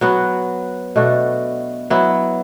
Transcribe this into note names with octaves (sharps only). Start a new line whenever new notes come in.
F#3 B3 F#4
B2 A3 D4 F#4
F#3 B3 E4